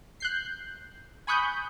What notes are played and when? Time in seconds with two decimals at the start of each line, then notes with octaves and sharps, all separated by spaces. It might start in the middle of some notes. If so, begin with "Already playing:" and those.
0.20 F#6 G6 C7
1.27 G#5 B5 C#6 D#6 F#6 G6